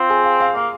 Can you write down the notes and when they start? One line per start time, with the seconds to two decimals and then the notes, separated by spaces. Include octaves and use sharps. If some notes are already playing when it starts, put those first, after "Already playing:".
Already playing: C4 F4
0.10 G#4
0.24 F5
0.40 F5
0.55 A#3 F5